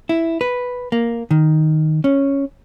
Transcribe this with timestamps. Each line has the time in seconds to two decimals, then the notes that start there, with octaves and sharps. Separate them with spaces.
0.09 E4
0.41 B4
0.92 A#3
1.31 D#3
2.04 C#4